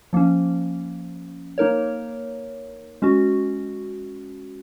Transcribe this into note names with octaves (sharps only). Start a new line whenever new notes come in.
F3 A#3 C#4
A#3 D#4 A#4 C#5
G#3 C#4 F#4